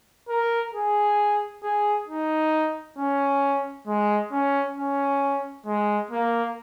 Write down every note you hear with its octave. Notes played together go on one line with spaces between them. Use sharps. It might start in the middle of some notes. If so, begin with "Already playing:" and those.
A#4
G#4
G#4
D#4
C#4
G#3
C#4
C#4
G#3
A#3